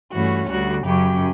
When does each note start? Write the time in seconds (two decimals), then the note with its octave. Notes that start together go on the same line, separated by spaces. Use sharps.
0.12 G2 E3 A3 C#4 F#4
0.49 D2 D3 G3 F#4
0.86 F#2 C#3 F#3 C#4 G4